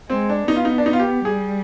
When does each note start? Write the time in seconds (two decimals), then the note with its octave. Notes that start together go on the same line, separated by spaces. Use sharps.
0.10 G#3 C4
0.30 D4
0.48 B3 D#4
0.56 F4
0.65 D#4
0.78 D4
0.86 D#4
0.93 F4
1.00 G4
1.25 G3 G#4